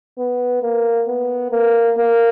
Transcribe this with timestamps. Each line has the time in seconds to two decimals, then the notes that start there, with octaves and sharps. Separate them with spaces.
0.18 B3
0.62 A#3
1.08 B3
1.51 A#3
1.97 A#3